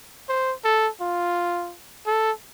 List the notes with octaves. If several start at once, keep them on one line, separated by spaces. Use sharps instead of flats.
C5
A4
F4
A4